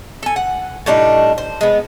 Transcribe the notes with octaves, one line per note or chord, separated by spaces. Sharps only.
A4 G#5
F#5
A2 G3 D4 D#4
C5
G#3 B3